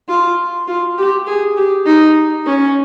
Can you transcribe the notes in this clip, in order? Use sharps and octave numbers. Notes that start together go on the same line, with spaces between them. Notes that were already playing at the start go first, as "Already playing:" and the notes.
F4
F4
G4
G#4
G4
D#4
C#4